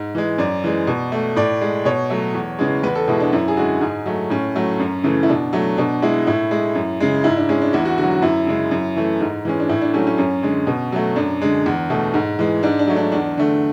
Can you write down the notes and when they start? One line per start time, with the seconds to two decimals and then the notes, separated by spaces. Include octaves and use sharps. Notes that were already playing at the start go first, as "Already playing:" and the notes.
Already playing: G#2
0.15 E3 G#3
0.38 F#2 D5
0.64 E3 G#3
0.87 B2
1.12 A3
1.36 A2 D5
1.61 G#3
1.85 B2 C#5
2.10 F#3 A3
2.35 E2
2.59 C#3 E3 G#3
2.83 E2 B4
2.95 A4
3.08 B2 G#3 E4
3.20 D4
3.33 F#2 E4
3.48 G#4
3.57 D3 G#3 F#4
3.81 G#2 G#4
4.06 F#3 A3
4.30 A2 C#4
4.55 F#3 A3
4.80 F#2
5.04 C#3 E3 A3
5.23 E4
5.29 B2 D4
5.53 F#3 A3
5.77 B2 D4
6.02 G#3 E4
6.27 A2 E4
6.51 G#3
6.75 F#2
7.00 C#3 G#3
7.24 G#2 E4
7.37 D4
7.49 G#3 C#4
7.62 D4
7.73 E2 E4
7.85 F#4
7.98 D3 F#4
8.03 F#3
8.11 F#4
8.22 F#2 E4
8.46 C#3 G#3
8.71 F#2
8.96 E3 A3
9.21 G#2
9.45 E3 G#3 C#4
9.60 D4
9.69 A2 E4
9.81 D4
9.93 F#3 A3 C#4
10.07 C#4
10.18 F#2 C#4
10.43 D3 G#3
10.67 B2
10.92 F#3 A3
11.16 F#2 D4
11.42 D3 G#3
11.66 E2
11.90 B2 A3
12.14 G#2
12.39 E3 G#3
12.63 G#2 D4
12.79 D4
12.87 F#3 A3
12.96 D4
13.12 E2 D4
13.37 D3 A3